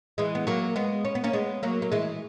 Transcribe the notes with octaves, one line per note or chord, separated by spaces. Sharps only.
E3 G#3
B3
F#3 A#3
G#3 B3
C#4
B3
A#3 C#4
G#3 B3
F#3 A#3
A#3
E3 G#3